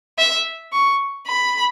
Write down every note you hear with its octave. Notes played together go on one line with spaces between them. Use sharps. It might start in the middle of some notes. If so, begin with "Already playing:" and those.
E5
C#6
B5